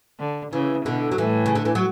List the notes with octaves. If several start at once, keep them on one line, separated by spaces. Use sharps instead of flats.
D3
C#3 E3
B2 D3
F#3
A2 E3
C#3
D3
E3
F#3